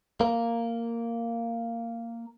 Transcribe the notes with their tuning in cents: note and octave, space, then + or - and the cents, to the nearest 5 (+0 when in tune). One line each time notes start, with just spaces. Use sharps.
A#3 -10